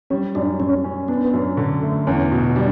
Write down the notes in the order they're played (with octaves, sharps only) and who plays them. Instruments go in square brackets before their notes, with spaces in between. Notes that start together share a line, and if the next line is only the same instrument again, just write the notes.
[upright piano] G3 [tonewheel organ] C#4
[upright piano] F#2 [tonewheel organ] D4
[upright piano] F#2 [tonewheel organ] C#4
[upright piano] C#4
[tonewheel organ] B3 [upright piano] D4
[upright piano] F#2
D3
A3
[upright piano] E2 [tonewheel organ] C#4
[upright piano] B2
[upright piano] G3 [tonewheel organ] D4